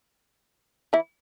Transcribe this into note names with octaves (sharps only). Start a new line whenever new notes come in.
E3 E4